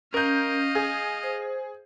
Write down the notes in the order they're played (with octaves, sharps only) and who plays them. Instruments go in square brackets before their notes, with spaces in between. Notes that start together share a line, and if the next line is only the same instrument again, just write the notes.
[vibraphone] C#4 [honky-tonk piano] A#4 G6 [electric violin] D#5 F5
[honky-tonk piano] G#4
[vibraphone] C5